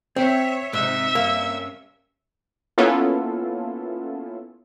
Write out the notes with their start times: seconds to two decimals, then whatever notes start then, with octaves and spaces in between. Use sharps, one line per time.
0.16 C4 C#5 E5
0.73 G#2 C3 D#4 E5
1.15 G2 C3 A#3 C#4
2.78 A#3 B3 C#4 E4 F4 A4